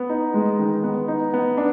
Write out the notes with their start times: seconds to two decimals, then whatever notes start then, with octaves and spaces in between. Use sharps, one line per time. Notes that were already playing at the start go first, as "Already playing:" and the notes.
Already playing: B3
0.09 D#4
0.34 G#3
0.59 D#3
0.84 B3
1.08 D#4
1.34 B3
1.57 D4